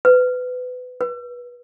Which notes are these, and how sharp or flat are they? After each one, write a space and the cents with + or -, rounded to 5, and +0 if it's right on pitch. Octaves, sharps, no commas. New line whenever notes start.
B4 +25
B4 -25